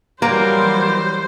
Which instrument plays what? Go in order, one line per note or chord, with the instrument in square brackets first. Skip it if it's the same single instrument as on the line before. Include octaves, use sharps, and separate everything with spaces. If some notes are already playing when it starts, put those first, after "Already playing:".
[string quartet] E3 F#3 G3 [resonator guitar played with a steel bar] A#3 [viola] C5 [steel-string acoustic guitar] A#5